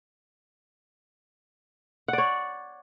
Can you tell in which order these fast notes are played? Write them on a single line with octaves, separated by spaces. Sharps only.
F#5 D5 C#5